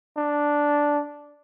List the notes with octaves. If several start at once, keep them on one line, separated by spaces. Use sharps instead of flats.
D4